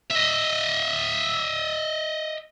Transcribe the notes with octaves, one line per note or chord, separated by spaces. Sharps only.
D#5 E5